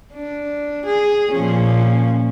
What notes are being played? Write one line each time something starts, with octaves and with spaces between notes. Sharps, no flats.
D4
G#4
A#2 F3 C#4